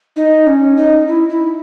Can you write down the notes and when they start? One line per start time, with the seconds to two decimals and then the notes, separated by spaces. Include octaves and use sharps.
0.16 D#4
0.47 C#4
0.77 D#4
1.08 E4
1.29 E4